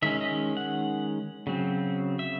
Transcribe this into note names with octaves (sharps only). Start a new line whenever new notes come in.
D#3 G#3 C#4 E5
D#5
F#5
C#3 F#3 C4
E5